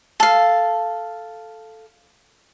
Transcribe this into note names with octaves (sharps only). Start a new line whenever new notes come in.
A4 F5